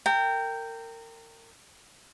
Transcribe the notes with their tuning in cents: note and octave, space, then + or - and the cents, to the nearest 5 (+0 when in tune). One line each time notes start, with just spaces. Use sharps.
A#4 -30 G5 +0